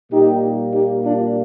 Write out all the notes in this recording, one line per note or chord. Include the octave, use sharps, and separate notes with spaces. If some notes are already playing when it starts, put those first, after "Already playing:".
A#2 G3 A#3 D#4 G4
D#4 G4
D4 F4